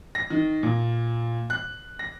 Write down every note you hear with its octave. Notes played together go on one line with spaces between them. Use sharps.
A#6
D#3
A#2
F#6
A#6